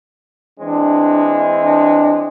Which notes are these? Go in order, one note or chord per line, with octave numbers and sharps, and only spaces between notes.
E3 G#3 C4 D4
D4